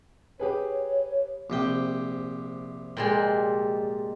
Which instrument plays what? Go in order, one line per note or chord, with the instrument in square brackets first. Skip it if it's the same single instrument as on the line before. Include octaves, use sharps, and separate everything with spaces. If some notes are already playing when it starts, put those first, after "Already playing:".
[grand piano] G4 G#4 B4 [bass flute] C#5
[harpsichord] A#1 C3 G5
[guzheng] A#2 G3 G#3